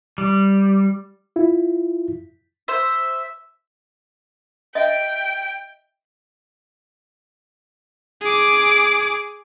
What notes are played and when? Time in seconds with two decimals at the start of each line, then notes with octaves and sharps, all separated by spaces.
0.18 G3
1.36 E4 F4
2.68 C5 E5
4.75 D#5 E5 G5
8.22 G#4 D6